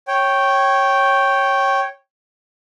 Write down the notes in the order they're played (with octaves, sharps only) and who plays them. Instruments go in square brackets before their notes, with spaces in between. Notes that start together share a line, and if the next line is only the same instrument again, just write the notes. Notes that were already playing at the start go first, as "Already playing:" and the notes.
[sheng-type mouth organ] C#5 G5